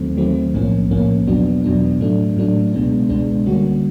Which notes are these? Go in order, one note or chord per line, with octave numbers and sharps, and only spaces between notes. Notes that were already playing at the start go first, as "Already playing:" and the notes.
Already playing: D#2 D#3 F#3 A3 C4
D#2 D#3 F#3 A3 C4
B1 A2 F3 A#3 C#4
B1 A2 F3 A#3 C#4
E2 B2 F#3 B3 D4
E2 B2 F#3 B3 D4
A2 F#3 A3 D4
A2 F#3 A3 D4
C#2 B2 G#3 B3 D4
C#2 B2 G#3 B3 D4
D3 G3 A#3 C#4 F#4